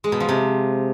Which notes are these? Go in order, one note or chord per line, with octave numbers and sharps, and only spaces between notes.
G#3
B2
F3
C3